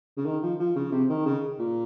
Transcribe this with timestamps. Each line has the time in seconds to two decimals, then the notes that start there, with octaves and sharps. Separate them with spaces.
0.17 C#3
0.26 D#3
0.42 F3
0.60 F3
0.76 C#3
0.92 C3
1.10 D#3
1.25 C#3
1.59 A#2